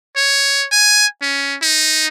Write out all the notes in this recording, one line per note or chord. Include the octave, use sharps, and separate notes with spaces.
C#5
G#5
C#4
D#4